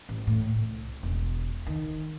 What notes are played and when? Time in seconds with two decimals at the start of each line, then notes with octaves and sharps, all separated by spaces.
0.09 A1
0.27 A2
0.55 C2
1.03 E1
1.67 D#3